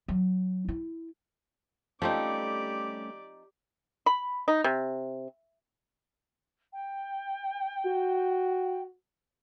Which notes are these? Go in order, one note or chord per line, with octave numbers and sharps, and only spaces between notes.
F#3
E4
F3 G3 A3 C4 C#4 D#4 G4 D5
B5
D#4
C3
G5
F#4